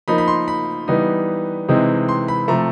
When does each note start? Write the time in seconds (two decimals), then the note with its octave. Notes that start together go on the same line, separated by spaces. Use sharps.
0.08 F3 A#3 D#4 B5
0.18 B5
0.28 C6
0.48 B5
0.88 E3 G3 B3 D#4
1.68 C3 E3 G#3 C4 D#4
2.09 C6
2.28 B5
2.48 C3 F3 A3 A#5